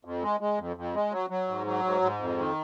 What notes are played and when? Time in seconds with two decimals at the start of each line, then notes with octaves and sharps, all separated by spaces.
0.05 F2
0.22 G#3
0.40 G#3
0.59 F2
0.76 F2
0.94 G#3
1.12 F#3
1.30 F#3
1.48 G#2
1.66 F#3
1.84 G#2
2.02 G#2
2.20 F2
2.38 D#3